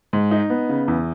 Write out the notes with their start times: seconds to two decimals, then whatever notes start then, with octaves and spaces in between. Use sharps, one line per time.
0.13 G#2
0.31 D#4
0.50 B3
0.69 C#3
0.88 E2